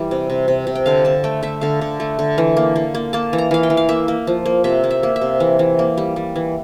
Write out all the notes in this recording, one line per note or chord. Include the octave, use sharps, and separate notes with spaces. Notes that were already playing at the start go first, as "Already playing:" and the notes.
Already playing: E3 G3
C3
C3
C3
C3
G5
D3 F5
D3 A5
A3 G5
A3 E5
D3 F5
D3
A3
D3
E3
A#3
A#3
A#3
A#3 A5
E3
A#5
E3 F5
G5
E3
F5
A#3 E5
A#3
F3
A#3
C3 E5
A#3
E5
A#3
E5
C3
E3
E3
A#3
G3
G3
E3